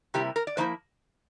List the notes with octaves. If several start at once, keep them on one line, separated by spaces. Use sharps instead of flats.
C3 G3 A#3 E4 G4
A#4
D5
D3 F3 A#3 E4 C5